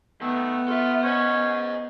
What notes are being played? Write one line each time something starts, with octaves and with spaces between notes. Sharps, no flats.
D#3 A3 B3
F4 A4 E5
C#4 C5 D#5